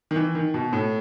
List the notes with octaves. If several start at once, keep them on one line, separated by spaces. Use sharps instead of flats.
D#3
E3
D#3
B2
A2